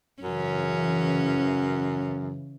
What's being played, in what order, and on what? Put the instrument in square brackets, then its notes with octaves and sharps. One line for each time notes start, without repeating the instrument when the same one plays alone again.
[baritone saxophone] F#2 [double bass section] C#3 E3 [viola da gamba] C#4